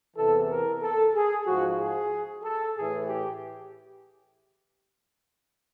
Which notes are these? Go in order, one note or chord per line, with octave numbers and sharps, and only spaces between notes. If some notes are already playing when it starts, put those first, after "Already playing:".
E2 C3 E3 A4
A#4
A4
G#4
G#2 F3 F#4
G#4
A4
A2 E3 G#4
G4